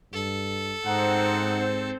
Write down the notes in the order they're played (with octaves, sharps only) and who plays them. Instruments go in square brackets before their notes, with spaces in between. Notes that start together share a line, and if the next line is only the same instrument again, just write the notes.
[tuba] G2 [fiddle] A4
[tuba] G#2 [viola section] C4 C5 [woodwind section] D#4 F#5